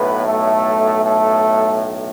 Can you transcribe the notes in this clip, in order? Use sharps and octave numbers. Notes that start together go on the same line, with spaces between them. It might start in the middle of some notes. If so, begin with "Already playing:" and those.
Already playing: B1 A2 B3 B4
A3 A4
A3 A4